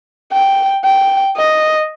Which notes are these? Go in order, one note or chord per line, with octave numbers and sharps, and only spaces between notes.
G5
G5
D#5